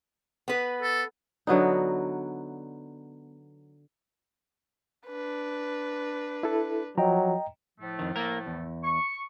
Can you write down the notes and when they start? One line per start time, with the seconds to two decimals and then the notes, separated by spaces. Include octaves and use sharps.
0.48 B3 B4
0.82 A4
1.47 D3 F#3 B3 D#4
5.07 D4 B4
6.43 E4 A4
6.98 F3 F#3 D#5 G5 A#5
7.79 A2 F3 A3
7.99 F2 D#3
8.16 A#3 A#4
8.46 E2
8.83 C#6